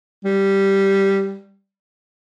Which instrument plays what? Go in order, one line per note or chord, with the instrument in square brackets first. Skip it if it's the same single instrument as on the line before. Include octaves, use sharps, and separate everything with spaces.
[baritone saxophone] G3